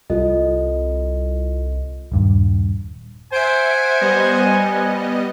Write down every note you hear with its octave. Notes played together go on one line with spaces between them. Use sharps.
C2 F4 A4 D#5
D#1 G2
C5 E5 F#5 G#5 C7 D7
G3 B3 D#5